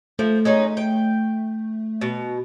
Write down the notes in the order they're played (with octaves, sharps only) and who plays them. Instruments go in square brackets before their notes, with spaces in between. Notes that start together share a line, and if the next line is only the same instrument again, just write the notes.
[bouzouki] F3 [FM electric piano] A3
[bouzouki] G#3 C#4 D#4
G5
B2